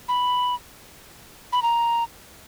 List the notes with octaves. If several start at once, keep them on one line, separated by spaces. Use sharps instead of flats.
B5
B5
A#5